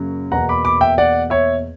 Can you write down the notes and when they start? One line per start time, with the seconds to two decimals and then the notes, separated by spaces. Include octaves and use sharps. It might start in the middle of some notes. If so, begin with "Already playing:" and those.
Already playing: F#2 C#3 F#3 A#3
0.32 E2 B2 A#3 F#5 A#5
0.49 B5 D6
0.65 B5 D6
0.81 E5 G5
0.98 D5 F#5
1.30 C#5 E5